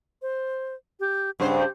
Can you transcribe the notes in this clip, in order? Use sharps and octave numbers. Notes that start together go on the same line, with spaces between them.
C5
G4
G2 C#3 C5 F#5
G4